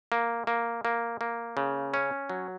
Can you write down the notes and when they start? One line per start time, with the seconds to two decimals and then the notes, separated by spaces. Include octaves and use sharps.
0.12 A#3
0.47 A#3
0.85 A#3
1.21 A#3
1.57 C#3
1.94 C#4
2.30 F#3